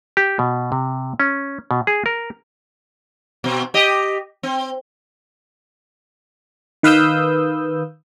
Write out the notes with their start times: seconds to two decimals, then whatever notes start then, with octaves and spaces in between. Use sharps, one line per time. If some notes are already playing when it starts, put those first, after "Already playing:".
0.17 G4
0.39 B2
0.72 C3
1.20 C#4
1.71 B2
1.87 G#4
2.06 A#4
3.44 B2 C4
3.74 G4 D#5
4.43 C4
6.83 D#3 B4 F5 D#6 E6 G6